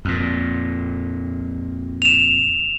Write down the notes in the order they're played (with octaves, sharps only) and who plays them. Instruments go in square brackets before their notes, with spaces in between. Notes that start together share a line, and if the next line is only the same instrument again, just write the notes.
[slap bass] F2 A#2
[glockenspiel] E7 F7